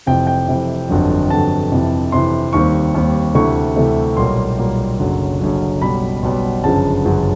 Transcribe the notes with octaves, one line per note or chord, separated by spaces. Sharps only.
F1 F2 C3 E3 G5
G5
F1 F2 C3 E3
G1 F2 D3 F#3
G1 F2 D3 F#3 A5
F2 C3 E3
F2 C3 E3 C6
D#2 D#3 G3 C4 C#6
D#2 D#3 G3 C4
D2 C3 E3 A3 C#6
D2 C3 E3 A3
B1 A#2 G3 A#3 C6
B1 A#2 G3 A#3
F#1 F#2 D3 F#3
F#1 F#2 D3 F#3
B1 B2 G3 B5
B1 B2 G3
G1 F#2 C#3 F3 A5
G1 F#2 C#3 F3